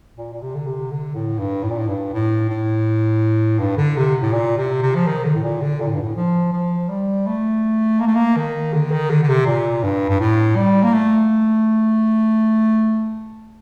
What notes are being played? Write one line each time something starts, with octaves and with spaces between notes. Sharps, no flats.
A#2
A#2
C3
D3
C3
D3
A2
G2
A2
A#2
A2
G2
A2
A2
G2
D3
C3
A2
A#2
C3
C3
F3
D#3
D3
A2
A#2
D3
A#2
A2
G2
A2
F3
F3
G3
A3
A#3
A3
A#3
D#3
D3
D#3
D3
D3
C3
A#2
G2
G2
A2
G3
A#3
A3